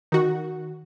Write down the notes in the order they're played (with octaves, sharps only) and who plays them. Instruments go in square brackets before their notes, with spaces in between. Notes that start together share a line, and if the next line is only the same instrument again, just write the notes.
[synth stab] D#3 F#4